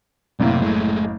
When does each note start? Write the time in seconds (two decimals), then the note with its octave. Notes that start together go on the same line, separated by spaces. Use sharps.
0.40 F#1 A2 C3 A#3
0.62 G#3 A3